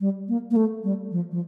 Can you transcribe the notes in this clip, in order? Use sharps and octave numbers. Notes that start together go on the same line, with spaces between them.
G3
A#3
A#3
A3
G3
F3
F3